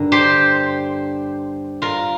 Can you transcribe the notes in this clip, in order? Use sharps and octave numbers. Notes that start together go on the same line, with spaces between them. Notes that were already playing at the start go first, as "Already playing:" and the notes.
Already playing: G2 D3 D4 A#4
G4 C5
F4 A#4